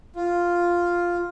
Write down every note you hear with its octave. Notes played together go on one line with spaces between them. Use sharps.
F4